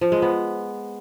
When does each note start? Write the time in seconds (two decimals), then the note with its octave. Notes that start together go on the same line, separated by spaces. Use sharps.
0.01 F3
0.12 G#3
0.22 B3